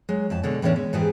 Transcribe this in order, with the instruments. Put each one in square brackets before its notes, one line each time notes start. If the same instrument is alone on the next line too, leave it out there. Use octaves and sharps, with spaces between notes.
[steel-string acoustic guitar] F#3 G#3
F2 F#4 A5
B2 D3 G#3 C#5
A2 E3 G3 A#3 C#4 D4
G#3
G#2 E3 B3 E4 G4 G#4